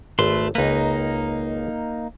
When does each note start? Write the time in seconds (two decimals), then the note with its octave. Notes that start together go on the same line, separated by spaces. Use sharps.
0.19 G#1 A3 B4 C6
0.55 C#2 A#3 D#4 B4